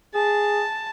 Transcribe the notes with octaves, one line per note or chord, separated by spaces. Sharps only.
G#4 A5